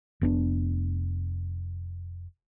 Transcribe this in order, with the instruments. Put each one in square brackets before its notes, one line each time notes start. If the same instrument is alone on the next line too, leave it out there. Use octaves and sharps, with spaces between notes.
[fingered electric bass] F1 B3 D4